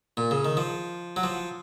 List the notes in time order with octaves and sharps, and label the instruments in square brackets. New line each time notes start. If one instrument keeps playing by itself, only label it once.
[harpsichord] A#2
C#3
D#3
F3
F#3
F3